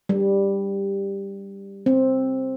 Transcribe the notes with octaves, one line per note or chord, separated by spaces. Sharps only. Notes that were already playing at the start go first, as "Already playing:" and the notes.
G3
C4